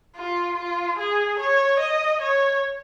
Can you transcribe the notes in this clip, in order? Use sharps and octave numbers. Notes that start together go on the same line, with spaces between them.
F4
F4
G#4
C#5
D#5
C#5